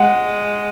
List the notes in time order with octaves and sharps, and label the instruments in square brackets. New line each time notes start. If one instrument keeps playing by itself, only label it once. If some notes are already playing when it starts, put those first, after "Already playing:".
Already playing: [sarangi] G#3 [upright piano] F#5